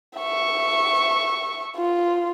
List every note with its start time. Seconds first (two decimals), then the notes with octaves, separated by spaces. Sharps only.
0.18 E5 C#6
1.77 F4